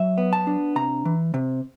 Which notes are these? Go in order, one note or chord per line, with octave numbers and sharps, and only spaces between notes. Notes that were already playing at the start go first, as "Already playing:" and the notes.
Already playing: F#3 E5
B3
A5
D4
C3 A#5
E3
C3